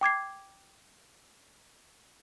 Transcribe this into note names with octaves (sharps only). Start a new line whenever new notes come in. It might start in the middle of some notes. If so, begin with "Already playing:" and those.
G5 D6 G#6 C7